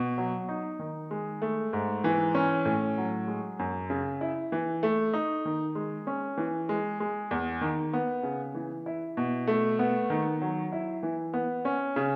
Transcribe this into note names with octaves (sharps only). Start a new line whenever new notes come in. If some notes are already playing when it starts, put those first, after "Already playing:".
Already playing: B2
F#3
D#4
D#3
G#3
A3
G#2
E3
C#4
A2
F#3
G#3
F#2
C#3
E4
E3
A3
D#4
D#3
G#3
C#4
E3
G#3
G#3
E2
D#3
B3
C#3
E3
E4
B2
A3
B3
D#3
F#3
E4
E3
B3
C#4
C#3